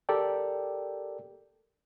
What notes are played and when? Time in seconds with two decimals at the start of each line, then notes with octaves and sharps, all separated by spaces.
0.09 G4 A4 A#4 D5 G5